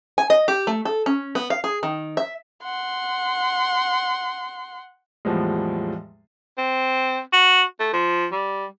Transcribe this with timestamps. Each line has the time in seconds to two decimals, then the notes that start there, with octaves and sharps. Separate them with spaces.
0.18 G#5
0.30 D#5
0.48 G4
0.67 A3
0.85 A4
1.06 C#4
1.35 B3
1.50 F5
1.64 G#4
1.83 D#3
2.17 E5
2.63 F#5 C6
5.25 E2 A2 F3 G3 G#3
6.58 C4
7.33 F#4
7.80 A3
7.93 F3
8.32 G3